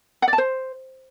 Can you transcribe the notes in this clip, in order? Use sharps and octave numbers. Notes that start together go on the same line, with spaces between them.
F#5
D5
A5
C5